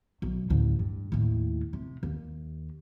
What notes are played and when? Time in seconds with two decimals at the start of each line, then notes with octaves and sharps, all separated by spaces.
0.22 B1
0.50 A1 D2
0.79 G2
1.12 D#2 A2
1.73 C3
2.03 D#2